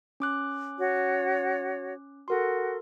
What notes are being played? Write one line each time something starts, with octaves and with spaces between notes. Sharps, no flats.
C#4 D6 F#6
F#4 C#5
F#4 A4 A#4 C6